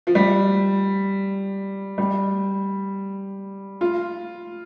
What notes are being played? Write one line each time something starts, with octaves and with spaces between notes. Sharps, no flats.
F3
G3
G3
F4